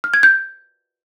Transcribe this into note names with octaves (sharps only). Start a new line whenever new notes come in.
F6
G#6
G6